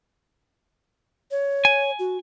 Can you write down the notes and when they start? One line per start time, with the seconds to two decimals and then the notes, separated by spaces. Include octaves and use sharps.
1.31 C#5
1.65 G#5
1.99 F#4